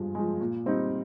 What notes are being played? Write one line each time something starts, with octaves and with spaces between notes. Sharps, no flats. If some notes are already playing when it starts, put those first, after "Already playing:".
Already playing: G2 F3 G#3
F3 G#3
A#2
G3 C4 D#4